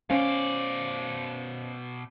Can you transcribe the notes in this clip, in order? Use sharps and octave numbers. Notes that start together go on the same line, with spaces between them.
B2 C#4 C5 D5 F5